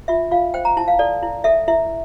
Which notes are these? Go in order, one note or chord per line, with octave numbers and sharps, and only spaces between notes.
F4 E5
F4 F5
C5 G5
A#5
E4 A5
F5
A4 D5
E4
A4 E5
E4 E5